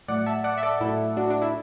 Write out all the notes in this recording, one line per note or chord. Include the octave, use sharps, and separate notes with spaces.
A2 F#3 A3 D5 F#5
E5 A5
D5 F#5
E5
A4 D5
A2 F#3 A3 E4 A4
D4 F#4
D4
E4